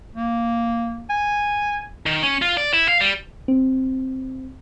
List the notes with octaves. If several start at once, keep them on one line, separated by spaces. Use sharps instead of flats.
A#3
G#5
D#3
C#4
F4
D5
E4
F5
G3
C4